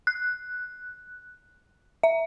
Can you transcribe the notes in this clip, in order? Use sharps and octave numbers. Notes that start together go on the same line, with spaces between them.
F#6
E5